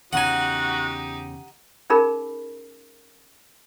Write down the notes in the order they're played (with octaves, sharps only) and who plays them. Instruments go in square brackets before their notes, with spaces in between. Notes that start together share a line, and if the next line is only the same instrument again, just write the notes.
[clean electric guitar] E2 C#3 [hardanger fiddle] D#4 G4 [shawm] F#4 [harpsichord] F#5 G#5
[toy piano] C#4 D#4 G#4 A#4 B5